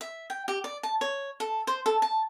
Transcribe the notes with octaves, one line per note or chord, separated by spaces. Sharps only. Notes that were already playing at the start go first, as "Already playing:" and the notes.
E5
G5
G4
D5
A5
C#5
A4
C5
A4
A5